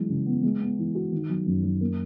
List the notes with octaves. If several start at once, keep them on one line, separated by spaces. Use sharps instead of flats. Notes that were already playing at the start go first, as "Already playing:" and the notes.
Already playing: E3 F#3 G#3
C#3
B3
G#3
B3
E3
F#4
D#3
F#3
F#2
F#2
A#3